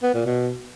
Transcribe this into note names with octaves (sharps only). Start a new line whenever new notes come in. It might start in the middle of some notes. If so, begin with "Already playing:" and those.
B3
A#2
B2